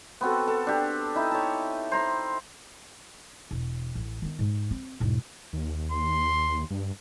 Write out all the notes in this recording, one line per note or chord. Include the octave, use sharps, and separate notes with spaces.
B3 C4 F#4 A4
A4
D4 G4
D#4 E4
C#5 A5
C5 A#5 C6
E1
A1
D#3 B3
G#2
C4
E1 G#2
D#2
C6
G2